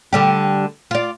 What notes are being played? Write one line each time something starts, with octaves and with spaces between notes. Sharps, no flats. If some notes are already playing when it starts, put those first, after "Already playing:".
D3 G3 G4
F4 D5